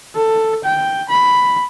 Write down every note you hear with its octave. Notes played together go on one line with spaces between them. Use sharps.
A4
G5
B5